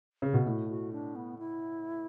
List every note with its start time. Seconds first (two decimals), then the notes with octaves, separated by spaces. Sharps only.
0.22 C#3
0.33 B2
0.46 A2 F#4
0.69 F#4
0.93 D4
1.16 B3
1.39 E4